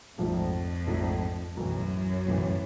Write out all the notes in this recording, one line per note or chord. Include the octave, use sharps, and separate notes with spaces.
A#1 F2 G#2 F3 A3
A#1 G#2 F3 A3
B1 F#2 A2 E3
B1 A2 E3